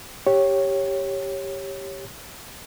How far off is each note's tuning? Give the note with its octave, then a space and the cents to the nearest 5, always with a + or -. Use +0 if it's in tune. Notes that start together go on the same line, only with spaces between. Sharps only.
G4 +0 C#5 -10